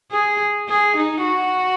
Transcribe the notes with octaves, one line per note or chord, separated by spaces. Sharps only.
G#4
G#4
D#4
F#4